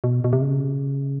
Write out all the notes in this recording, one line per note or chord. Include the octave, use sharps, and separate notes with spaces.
B2
B2
C3
C#3